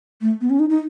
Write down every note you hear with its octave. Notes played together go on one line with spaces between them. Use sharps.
A3
B3
C#4
D#4
D#4